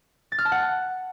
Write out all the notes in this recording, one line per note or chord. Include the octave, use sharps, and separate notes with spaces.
A6
F6
A5
F#5